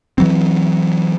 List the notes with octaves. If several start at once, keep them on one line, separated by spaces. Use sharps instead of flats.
E3 F#3 C4